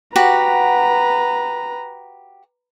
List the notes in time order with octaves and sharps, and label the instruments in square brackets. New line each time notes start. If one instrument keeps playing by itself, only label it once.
[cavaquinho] F#4 G4 F#5 [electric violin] B4 A#5